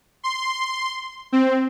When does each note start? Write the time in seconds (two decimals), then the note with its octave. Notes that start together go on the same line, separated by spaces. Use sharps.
0.23 C6
1.32 C4